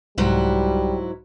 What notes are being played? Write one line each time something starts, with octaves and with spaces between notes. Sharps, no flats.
C2 G#2 F#3 G3 E4